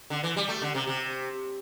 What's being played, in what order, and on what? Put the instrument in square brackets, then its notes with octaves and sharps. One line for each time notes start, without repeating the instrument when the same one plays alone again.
[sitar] D3
E3
G3
A3
D3
C3
C3